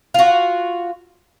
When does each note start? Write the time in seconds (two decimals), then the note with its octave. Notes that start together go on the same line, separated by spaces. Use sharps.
0.14 F4 F#4